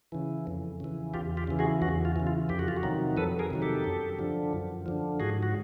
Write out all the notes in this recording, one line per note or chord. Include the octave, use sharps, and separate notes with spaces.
C#3 E3
F2
C#3 E3
E2 F4 G4
F4 G4
C#3 E3
F#4 G#4
E2 F#4
F4
C#3 E3
F4
F2 G4
F#4
F4
F#4
C3 D#3 F#3
F2 A4 B4
G#4 A#4
C3 D#3 F#3
G4 A4
F#2
D3 F3
F#2
D3 F3
G#2 F#4 G#4
F#4